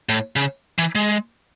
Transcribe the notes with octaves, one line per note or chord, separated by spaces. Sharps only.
A2
C#3
E3
G#3